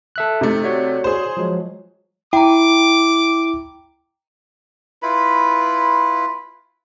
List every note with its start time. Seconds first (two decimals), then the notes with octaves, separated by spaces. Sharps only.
0.16 A4 E5 F#6
0.41 C3 A3 D#4
0.64 F#4 C#5 D5
1.04 G#4 C5
1.37 F3 F#3 G#3
2.33 E4 G5 A#5 D6
5.02 E4 F4 B4 B5